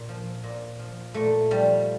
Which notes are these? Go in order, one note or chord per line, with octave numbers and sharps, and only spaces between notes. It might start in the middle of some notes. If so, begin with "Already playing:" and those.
Already playing: A#2
F3
A#2
F3
A#2 A3
F3 G3